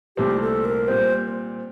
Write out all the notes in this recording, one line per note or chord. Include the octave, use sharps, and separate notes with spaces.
C2 A#2 A3 C4 G4
A4
A#4
A#2 G3 C4 C5